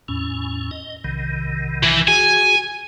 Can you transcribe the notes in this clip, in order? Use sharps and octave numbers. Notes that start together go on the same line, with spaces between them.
E2 A2 C#4
D#5
B1 C3 D#3
E3
F#4 G#4 G#5